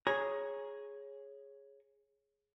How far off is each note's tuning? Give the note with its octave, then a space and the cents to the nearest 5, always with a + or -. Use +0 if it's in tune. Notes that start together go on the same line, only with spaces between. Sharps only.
G#4 +0 C#5 -5 A#5 +15